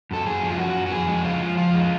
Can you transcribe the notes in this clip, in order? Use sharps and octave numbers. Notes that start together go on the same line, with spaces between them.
F#2 A4
F#2 G#4
F3
F4
F#2 F#4
F#2
F#4
F2 G#4
G#3
F3 F4
F3
F2 F4
G#3